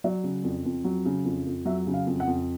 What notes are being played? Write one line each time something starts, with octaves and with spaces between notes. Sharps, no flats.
F#3 D5
C#3
F2
F2
F#3
C#3
F2
F2
F#3 E5
C#3
F5
F2
F#5
F2